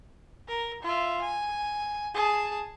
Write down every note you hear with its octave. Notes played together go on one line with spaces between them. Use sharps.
A#4
F4 E5
G#5
G#4 A5